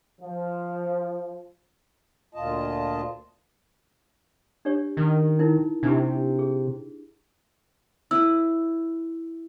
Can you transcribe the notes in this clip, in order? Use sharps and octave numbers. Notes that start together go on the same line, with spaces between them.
F3
D2 A#2 F4 D#5 A5
D4 G4 C#5
D#3
D#4 E4 A#4
C3 D4 E4 G4
G#4
E4 B4 E6